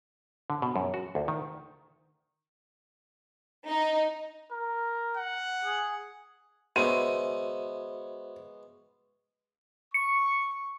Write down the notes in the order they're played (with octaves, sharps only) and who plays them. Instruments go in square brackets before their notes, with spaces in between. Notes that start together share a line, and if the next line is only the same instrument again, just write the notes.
[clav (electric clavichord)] D3
B2
F#2
F#4
D2
D#3
[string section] D#4
[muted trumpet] A#4
[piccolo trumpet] F#5
[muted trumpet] G#4
[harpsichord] G#3 B3 C#4 [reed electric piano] F#4 C5 E5 [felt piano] D#7
[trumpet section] C#6 [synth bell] C#7